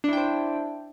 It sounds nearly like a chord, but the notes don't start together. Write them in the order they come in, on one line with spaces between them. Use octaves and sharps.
D4 E4 G5 C5